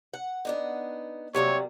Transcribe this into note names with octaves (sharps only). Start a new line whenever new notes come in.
F#5
B3 D4 D#4
C3 F#3 G3 A#3 C#5